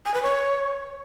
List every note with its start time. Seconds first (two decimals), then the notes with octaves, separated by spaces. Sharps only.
0.06 G#5
0.14 B4
0.23 C#5